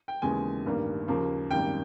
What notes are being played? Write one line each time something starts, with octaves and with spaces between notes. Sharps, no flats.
G5
D#2 C#3 E3 G#3 B3 G#5
A1 G2 D#3 G3 A#3
D#2 C#3 F3 A#3
G#1 F#2 D#3 G3 A#3 G5